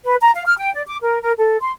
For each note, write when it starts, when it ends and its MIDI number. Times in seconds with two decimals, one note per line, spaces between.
0.05 0.15 71
0.21 0.31 82
0.35 0.46 77
0.46 0.56 89
0.58 0.72 79
0.74 0.83 74
0.87 0.96 86
1.02 1.21 70
1.22 1.32 70
1.38 1.58 69
1.61 1.71 84